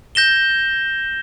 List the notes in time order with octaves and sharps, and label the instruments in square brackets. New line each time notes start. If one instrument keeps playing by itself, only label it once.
[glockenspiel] G6 A#6 E7 G7